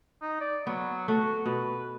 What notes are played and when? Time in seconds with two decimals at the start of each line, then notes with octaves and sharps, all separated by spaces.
0.22 D#4
0.41 D5
0.67 F#3 B3
1.08 A3 F#4
1.46 B2 B4